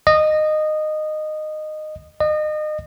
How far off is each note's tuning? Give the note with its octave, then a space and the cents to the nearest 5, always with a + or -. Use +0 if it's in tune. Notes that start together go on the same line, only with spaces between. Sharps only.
D#5 -15
D#5 -30